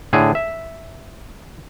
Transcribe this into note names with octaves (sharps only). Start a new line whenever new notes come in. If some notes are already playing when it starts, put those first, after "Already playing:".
A2 D3 G#4
E5